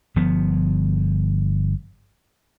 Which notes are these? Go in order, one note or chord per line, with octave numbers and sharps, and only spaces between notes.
G1 F3 B3